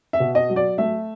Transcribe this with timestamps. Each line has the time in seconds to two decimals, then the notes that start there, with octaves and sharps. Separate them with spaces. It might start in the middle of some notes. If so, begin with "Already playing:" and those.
0.13 E5
0.20 B2
0.35 D#5
0.50 F#3
0.56 D5
0.78 A3 E5